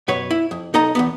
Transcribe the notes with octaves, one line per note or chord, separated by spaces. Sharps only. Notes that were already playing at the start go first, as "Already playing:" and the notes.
F#2 B2 B4 C#5
E4
F2
B1 D#4 A4 D#5 A#5
E2 G2 B3